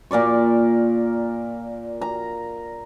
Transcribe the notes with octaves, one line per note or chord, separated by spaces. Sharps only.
A#2 A#4 D5 C#6
A#5